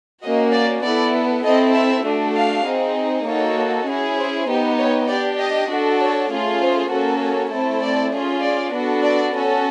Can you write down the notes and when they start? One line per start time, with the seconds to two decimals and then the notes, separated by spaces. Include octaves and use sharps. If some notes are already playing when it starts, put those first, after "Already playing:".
0.23 A#3 C#4 F#4 D#5
0.53 D5
0.83 B3 E4 A4 D5
1.44 C4 E4 A4 D#5
1.74 E5
2.04 A3 D4 F#4 A4
2.36 F5
2.65 C4 D#4 G#4
3.26 A#3 D#4 F#4 A4 C#5
3.87 C#4 E4 G#4
4.17 C5
4.48 B3 D#4 G4
4.79 C#5
5.08 D4 G4 D5
5.38 D#5
5.70 D4 F#4 A4
6.00 C#5
6.30 A3 C#4 F4 G#4
6.61 C5
6.90 A#3 C#4 F#4 A4
7.20 C#5
7.51 A3 C4 E4 A4
7.82 D5
8.12 C#4 F4 G#4
8.42 D5
8.72 B3 D4 F#4 A4
9.03 D5
9.33 C#4 F#4 A4